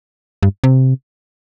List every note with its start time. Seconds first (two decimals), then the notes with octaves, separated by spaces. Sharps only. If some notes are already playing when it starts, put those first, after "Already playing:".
0.43 G2
0.64 C3